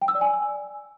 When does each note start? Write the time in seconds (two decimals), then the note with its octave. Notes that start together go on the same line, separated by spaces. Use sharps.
0.02 G5
0.08 E6
0.15 D5
0.21 G#5